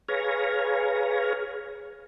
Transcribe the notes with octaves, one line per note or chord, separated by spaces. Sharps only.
G#4 B4 C#5 F5 G#5 A#5